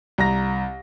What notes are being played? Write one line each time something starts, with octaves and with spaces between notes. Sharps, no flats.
C2 A#5 A#6